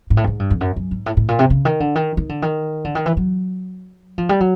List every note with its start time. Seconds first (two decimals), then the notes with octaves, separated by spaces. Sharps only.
0.10 G#2
0.17 A2
0.24 G2
0.27 G#2
0.39 G2
0.50 F2
0.61 F#2
0.76 F#2
0.91 G#2
1.06 A2
1.17 A2
1.28 A#2
1.39 C3
1.50 C#3
1.65 D#3
1.80 D3
1.95 D#3
2.17 D#3
2.29 D3
2.42 D#3
2.85 D3
2.95 D#3
3.06 E3
3.17 F#3
4.18 F3
4.29 G3
4.40 F#3